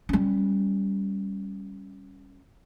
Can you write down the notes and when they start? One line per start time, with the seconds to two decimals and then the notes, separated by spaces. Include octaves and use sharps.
0.09 G3 C#4